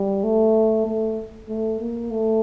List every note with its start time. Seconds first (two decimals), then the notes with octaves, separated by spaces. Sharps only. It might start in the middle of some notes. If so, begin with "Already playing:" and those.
Already playing: G3
0.24 A3
0.86 A3
1.49 A3
1.80 A#3
2.11 A3